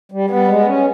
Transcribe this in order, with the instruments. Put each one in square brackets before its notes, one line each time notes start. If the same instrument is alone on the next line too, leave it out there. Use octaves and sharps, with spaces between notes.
[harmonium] G3
[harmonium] G3 [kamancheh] B3
[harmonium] G#3
C#4